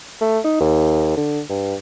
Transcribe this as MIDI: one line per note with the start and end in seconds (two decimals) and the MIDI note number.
0.21 0.39 57
0.44 0.56 63
0.61 1.13 39
1.17 1.41 50
1.49 1.75 43